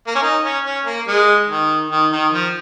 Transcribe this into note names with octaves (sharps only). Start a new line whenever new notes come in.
A#3
C#4
D#4
C#4
C#4
A#3
G#3
D#3
D#3
D#3
F3